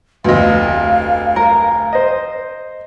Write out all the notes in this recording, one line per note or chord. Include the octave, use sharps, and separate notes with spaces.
F1 D2 B3 D#5 F5
A#4
C5 D#5